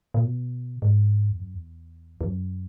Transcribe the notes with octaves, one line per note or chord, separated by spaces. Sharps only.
A#2
B2
G#2
E2
F#2
E2
E2
F#2